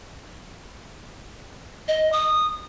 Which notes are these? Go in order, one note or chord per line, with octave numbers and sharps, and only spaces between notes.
D#5
D#6